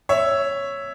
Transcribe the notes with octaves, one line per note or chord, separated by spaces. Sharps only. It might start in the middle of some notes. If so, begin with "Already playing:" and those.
C#5 E5